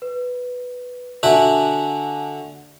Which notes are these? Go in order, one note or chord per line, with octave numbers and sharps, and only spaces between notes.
B4
D3 F#4 E5 G#5 A5